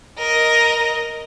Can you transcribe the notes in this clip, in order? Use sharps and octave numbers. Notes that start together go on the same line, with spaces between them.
A#4 D#5